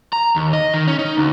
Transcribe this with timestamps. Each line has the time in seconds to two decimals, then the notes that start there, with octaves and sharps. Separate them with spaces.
0.13 A#5
0.36 D#2
0.53 D#5
0.74 D#3
0.88 C#4
0.99 D#4
1.17 D2